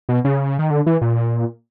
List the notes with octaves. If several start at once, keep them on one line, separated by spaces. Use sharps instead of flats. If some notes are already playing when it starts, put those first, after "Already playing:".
B2
C#3
D#3
D3
E3
A#2